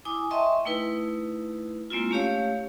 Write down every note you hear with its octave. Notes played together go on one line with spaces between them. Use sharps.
E4 G#5 D6 D#6
D#5 E5 G5 A5 C6 C#6
A3 D#4 E4 B4
G#3 A#3 C4 E4 F4
A3 C#4 G4 C#5 F5